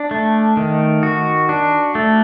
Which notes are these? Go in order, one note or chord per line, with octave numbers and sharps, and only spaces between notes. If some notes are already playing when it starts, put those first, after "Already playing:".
Already playing: D4
A3
D#3
F#4
D4
A3